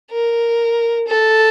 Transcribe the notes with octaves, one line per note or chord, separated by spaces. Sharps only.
A#4
A4